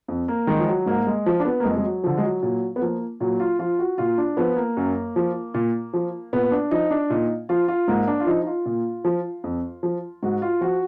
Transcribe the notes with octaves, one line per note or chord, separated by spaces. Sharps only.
F2
A#3
D#3 G#3
F3
F#3
G#2 A#3
G#3
F3
D4
B3
A#3
F2 G#3
G#3
F#3
D3 F3
G#3
F#3
A#2 F#3
B3
F3 A#3
A#2 F#3
F4
F3 F4
F#4
A#2 F4
D4
F3 B3
A#3
F#2
F3
A#2
F3
A#2 B3
D4
F3 D#4
D4
A#2 D#4
F3 F4
F4
G#2 A#3
D4
F4
F3 D#4
D#4
F4
A#2
F3
F2
F3
G#2 F#4
F4
F3 F#4